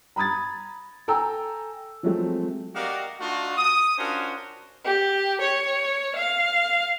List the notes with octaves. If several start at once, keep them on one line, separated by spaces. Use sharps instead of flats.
A#5 B5 D#6 G#6 A6
A4 G5 G#5 A#5 E6
F3 F#3 G#3 A3 C4
F#4 G4 A#4 D5 D#5 F5
A3 D4 D#4 F4 F#4
D#6
C#4 D4 F4 F#4 A#4 C5
G4
C#5
F5